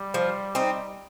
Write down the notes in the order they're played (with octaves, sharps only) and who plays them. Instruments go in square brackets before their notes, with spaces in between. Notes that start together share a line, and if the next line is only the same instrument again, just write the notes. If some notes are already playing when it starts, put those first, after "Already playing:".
Already playing: [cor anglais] G3
[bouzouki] F3
C4 D#4